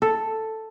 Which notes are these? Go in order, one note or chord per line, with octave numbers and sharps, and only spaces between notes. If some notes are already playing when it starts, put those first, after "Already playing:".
A4